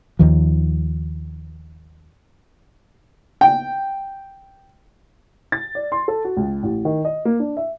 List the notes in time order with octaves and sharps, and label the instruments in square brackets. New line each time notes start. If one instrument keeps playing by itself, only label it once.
[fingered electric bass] D#2 D#3 F3
[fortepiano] G5
[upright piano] A6
D5
C6
A4
F#4
C#2
A1
D#3
D#5
A#3
D4
E5